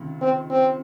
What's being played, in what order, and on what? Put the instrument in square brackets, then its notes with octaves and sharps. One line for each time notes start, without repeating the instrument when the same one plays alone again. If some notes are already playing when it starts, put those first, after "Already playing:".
Already playing: [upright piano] C#2 C3 D#3
[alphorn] C4
C4